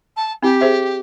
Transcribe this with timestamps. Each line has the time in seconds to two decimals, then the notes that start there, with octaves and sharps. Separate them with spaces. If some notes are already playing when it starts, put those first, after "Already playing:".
0.16 A5
0.43 C4 E4 G4
0.61 G#4 C5 E5